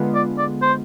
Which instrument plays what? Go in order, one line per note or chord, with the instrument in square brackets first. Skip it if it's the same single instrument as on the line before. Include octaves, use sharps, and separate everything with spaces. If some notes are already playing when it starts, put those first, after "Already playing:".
Already playing: [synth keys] D3 G#3 B3 F4
[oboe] D5
D5
C5